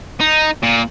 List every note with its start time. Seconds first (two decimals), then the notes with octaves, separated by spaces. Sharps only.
0.21 D#4
0.63 A#2